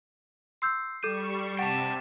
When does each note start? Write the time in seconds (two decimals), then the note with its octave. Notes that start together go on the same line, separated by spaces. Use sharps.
0.62 C6 E6 G6 C7
1.03 G3 A4 C#6 D6 G6 C7 D#7
1.59 C3 F#5 G5 A5 A6 B6 E7